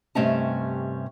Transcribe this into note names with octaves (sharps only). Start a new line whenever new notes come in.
G2 C3 A3 C#4 D#5 A5